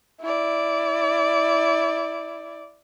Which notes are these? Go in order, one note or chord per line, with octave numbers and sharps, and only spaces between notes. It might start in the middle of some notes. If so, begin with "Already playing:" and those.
E4 D5